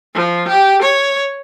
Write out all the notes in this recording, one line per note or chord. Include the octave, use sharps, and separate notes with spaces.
F3
G4
C#5